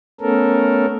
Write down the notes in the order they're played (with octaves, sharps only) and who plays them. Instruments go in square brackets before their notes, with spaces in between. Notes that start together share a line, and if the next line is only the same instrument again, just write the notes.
[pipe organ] A3 B3 C#4 A4 A#4